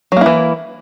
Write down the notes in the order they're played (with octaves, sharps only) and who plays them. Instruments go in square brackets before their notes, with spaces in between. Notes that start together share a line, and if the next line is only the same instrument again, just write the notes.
[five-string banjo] F#3
A#3
E4
E3